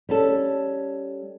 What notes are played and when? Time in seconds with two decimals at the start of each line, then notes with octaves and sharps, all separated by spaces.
0.09 G3 C#4 A4